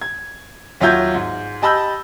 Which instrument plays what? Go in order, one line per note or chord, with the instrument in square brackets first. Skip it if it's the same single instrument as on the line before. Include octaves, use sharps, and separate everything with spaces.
[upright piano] G#6
D#2 F#3 F4 E5 G6 G#6
G#2
G4 D#5 A5 B5 E6 G6